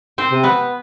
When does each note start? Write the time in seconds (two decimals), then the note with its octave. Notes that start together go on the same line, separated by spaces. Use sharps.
0.18 C4 C5
0.31 C3
0.43 B3 B4